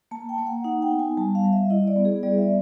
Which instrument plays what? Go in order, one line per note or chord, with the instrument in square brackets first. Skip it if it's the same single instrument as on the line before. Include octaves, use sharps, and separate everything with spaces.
[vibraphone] A#3 A5
G5
A#3
F#5
D#4 F#5
G5
B3
G#5
G3 A5
F5
G3
E5
E4 D#5
D5
B3
G#4
G3 D5
E5